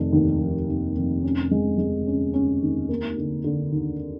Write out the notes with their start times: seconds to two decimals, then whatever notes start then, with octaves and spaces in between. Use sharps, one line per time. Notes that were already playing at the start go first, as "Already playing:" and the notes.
Already playing: F1 D#3
0.13 D#2
0.40 F1
0.68 F1
0.96 F1
1.23 C#4
1.51 G#3
1.78 G#3
2.06 C#4
2.33 C#4
2.62 D#2
2.89 A#3
3.18 D3
3.44 D3
3.72 D#2